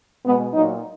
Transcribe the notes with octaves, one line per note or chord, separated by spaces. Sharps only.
B2 G#3 B3
A#2 F#3 D#4